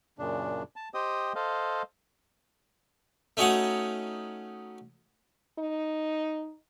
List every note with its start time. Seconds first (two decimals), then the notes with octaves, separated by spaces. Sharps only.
0.19 F#2 A#2 C#3 D4
0.76 A5
0.94 G4 C5 D#5 G5 D#6
1.35 A4 C5 D#5 F5
3.37 A3 C#4 D#4 F#4 C#5 F#5
5.59 D#4